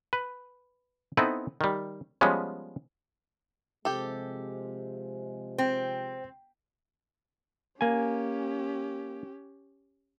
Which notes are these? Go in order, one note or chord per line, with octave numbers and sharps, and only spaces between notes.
B4
B3 C4 D#4 E4 A4 B4
D#3 G3
F3 G3 G#3 B3 C#4
C3 F3 G#3 G4 A4
C4 C5 G5
A#3 C#4 G4 G#5